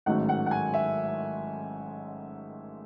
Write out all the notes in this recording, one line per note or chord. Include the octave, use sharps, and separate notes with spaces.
A1 G#2 D#3 F#3 A3 F#5
F#5
F#5
G#5
E5